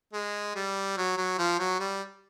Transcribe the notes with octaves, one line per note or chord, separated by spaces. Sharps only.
G#3
G3
F#3
F#3
F3
F#3
G3